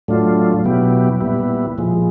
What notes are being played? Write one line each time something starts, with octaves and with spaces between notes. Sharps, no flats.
A2 F#3 A3 D4 F4
B2 F#3 B3 E4 G4
A#2 G3 B3 E4
A#2 F3 G#3